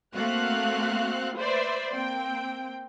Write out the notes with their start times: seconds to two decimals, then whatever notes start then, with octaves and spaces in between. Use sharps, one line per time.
0.15 A3 A#3 C4 F#4 F5 F#6
1.37 B4 C5 D5 E5
1.93 A#3 C4 G5